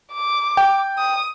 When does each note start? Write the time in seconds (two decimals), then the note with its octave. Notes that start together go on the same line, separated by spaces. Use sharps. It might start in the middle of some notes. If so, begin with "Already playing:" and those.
0.13 D6
0.57 G5
0.98 D#6